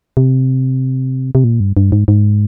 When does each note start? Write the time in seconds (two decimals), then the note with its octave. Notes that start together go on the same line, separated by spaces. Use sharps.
0.17 C3
1.35 C3
1.44 A#2
1.60 G2
1.77 G2
1.92 G#2
2.08 G#2